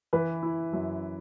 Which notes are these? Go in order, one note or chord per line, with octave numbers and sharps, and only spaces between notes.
E3 B4
E4
F#2